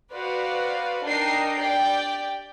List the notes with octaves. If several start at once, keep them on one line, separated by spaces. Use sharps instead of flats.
F#4 B4 C5 D5 F5
D4 D#4 A#4 D#5 G5 C7
G4 D5 G5